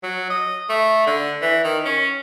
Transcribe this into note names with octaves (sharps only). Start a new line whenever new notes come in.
F#3
D#5
A3
D3
E3
D#3
C#4